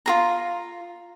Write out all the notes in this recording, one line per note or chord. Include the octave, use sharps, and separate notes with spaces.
F4 G#4 A#5